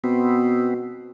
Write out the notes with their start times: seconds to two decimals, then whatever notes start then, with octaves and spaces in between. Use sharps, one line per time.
0.04 B2 B3 C4